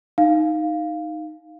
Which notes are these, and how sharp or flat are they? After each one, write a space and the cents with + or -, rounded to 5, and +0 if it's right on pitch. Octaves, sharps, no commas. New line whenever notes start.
D#4 +0 F5 +0